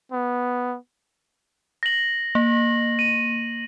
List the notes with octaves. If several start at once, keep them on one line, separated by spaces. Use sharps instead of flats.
B3
A#6 F#7
A#3
D#7